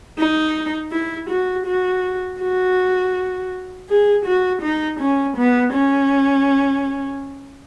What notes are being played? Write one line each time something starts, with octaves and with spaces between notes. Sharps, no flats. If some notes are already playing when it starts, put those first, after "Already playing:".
D#4
E4
F#4
F#4
F#4
G#4
F#4
D#4
C#4
B3
C#4